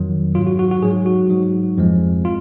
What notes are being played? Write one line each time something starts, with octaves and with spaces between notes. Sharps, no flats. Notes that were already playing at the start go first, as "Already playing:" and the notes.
Already playing: F2 D#3 F#3
G#2 F#3 F4
F#4
F#4
F#4
G#2 F#3 G#4
F#4
G#2 F#3
F2 F3 G#3
F4